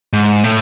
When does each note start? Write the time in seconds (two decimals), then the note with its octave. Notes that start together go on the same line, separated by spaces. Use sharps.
0.13 G#2
0.44 A2